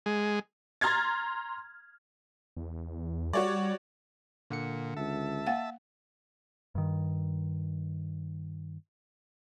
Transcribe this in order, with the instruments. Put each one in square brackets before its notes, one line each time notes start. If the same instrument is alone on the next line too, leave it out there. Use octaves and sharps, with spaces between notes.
[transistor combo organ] G#3
[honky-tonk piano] A#5 C6 F6 G#6 A6
[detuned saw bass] E2
[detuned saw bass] G3 [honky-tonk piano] F#4 C#5 D5
[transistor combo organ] A#2 [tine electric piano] D3 F#5 C#7
[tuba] C#2 [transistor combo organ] E5 A5
[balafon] A#3 F5 F#5
[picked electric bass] G2 D#3